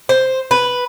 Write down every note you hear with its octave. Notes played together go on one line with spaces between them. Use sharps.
C5
B4